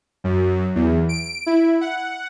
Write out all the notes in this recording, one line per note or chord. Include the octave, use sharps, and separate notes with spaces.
F#2
E2
D7
E4
F#5